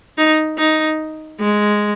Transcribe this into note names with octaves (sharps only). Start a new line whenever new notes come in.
D#4
D#4
G#3